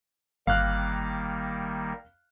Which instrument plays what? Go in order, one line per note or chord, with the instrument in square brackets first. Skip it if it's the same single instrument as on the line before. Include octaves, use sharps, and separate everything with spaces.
[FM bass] G1 [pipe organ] D#3 G3 A#3 [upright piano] F5 F6 F#6